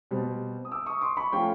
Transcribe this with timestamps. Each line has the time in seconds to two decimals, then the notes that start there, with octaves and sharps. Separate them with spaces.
0.11 B2 G3 C4
0.65 D#6
0.71 D6 E6
0.86 C#6 D#6
1.01 C6 D6
1.17 B5 C#6
1.32 F3 A3 C#4 F4 F5 G5